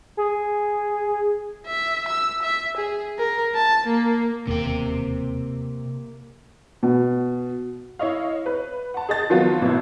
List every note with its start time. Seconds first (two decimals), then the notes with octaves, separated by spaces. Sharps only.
0.17 G#4
1.67 E5
2.08 E6
2.43 E5
2.77 G#4
3.19 A#4
3.55 A5
3.87 A#3
4.47 E1 D#2 C3 A#3 G5
6.83 B2
7.99 E4 C#5 D#5 F5
8.46 B4
8.94 F#5 A5
9.09 G#4 D#5 A6
9.30 D#3 F3 F#3 B3 F4 F#4
9.62 A1 B2 E4